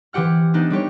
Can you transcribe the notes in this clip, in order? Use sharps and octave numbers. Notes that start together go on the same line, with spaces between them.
E3 C4 G4 F#5 F6
B3 D4 D#4
G3 C4 G4 C#5